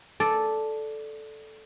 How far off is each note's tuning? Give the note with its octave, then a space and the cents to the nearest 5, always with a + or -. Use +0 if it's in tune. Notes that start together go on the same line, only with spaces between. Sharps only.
A4 -5 D5 +0